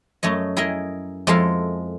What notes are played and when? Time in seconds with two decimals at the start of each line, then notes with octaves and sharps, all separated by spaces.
0.23 F#2 A3 C#5 D#5
0.57 E4 G#4 A#4 D#5 E5
1.27 F2 G#3 E4 A4 A#4 F5